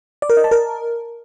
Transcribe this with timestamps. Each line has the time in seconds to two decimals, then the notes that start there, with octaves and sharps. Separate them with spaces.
0.22 D5
0.30 A#4
0.37 D#5
0.44 A5
0.51 A#4